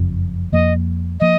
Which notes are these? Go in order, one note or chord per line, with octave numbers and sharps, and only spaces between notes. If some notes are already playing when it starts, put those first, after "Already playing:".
Already playing: F#1 F2 F3
F2 F3 A#3 D#5
F3 A#3 D#5